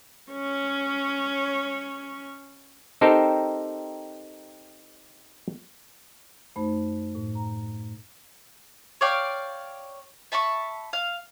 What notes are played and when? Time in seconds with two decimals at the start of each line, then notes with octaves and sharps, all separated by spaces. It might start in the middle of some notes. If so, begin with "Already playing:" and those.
0.32 C#4 C#5
3.01 C4 D#4 G4 A4 A#4 C5
6.56 F#2 A3 D#4 C5 B5
7.15 A2
7.35 A#5
9.01 C#5 D5 F5 G5
10.32 E5 A5 B5 C#6
10.93 F5